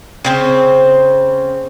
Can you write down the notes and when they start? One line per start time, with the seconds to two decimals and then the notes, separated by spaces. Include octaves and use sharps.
0.25 C#3 C4 C5